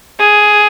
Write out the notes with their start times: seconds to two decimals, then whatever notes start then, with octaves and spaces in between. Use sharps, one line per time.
0.20 G#4